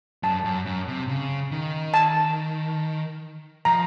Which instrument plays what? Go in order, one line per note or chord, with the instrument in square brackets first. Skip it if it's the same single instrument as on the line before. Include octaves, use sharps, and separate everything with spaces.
[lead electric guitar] F#2 [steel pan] A5
[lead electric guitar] F#2
F#2
C3
C#3
D#3
[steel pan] A5
[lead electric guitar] F3 [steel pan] A#5